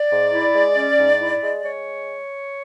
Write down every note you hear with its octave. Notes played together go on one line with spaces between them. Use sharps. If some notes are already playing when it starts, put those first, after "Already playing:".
Already playing: D5
G#2
E4
G#3
C#4
G#2
E4
G#3
G#3 C#5